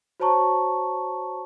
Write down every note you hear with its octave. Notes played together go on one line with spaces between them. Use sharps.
F#4 C5 C#5 A5 A#5 C#6